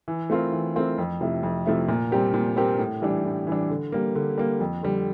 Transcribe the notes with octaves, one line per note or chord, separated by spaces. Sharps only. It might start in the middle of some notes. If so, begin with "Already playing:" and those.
E3
A3 C4 F4 A#4
E3
A3 C4 F4 A#4
F2
C3 F3 A3 E4
F2
C3 F3 A3 E4
A#2
G3 C4 G4 A#4
A#2
G3 C4 G4 A#4
A2
E3 G3 D4
A2
E3 G3 D4
D3
G3 A#3
D3
G3 A#3
F2
D3 G3